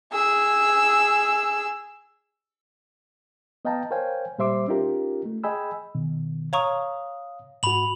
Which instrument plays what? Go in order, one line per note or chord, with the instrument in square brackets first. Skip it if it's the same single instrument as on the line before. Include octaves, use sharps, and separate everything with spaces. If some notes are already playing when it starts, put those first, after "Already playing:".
[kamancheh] G#4 E6
[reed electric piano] B3 D#5 F5 G5 A5 A#5
A#4 C5 C#5 F5 G5 G#5
A#2 G3 C5 E5 C6 D6
C#4 D#4 F4 G4 A#4
A3
G#4 D#5 G5 G#5 B5 E6
B2 D#3
[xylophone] C#5 A#5 C#6 [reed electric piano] F5 D#6
[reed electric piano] G#2 F#4 [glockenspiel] B5 F#7